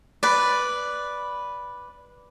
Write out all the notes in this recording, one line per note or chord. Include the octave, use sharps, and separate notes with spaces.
B4 D5